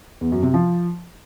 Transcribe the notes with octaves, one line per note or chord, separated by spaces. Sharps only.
E2
F#2
C3
F3